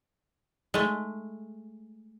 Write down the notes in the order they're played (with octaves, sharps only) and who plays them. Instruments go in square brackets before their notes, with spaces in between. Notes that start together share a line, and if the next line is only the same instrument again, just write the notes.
[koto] G#3 A3